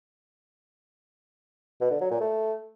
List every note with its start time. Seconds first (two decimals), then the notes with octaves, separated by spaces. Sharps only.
1.81 B2
1.91 D3
2.01 F#3
2.11 A#2
2.21 A3